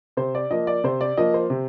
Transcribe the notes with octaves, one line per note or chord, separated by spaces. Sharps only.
C3 C5
D5
F3 A#3 D#5
D5
C3 C5
D5
F3 A#3 D#5
C5
C3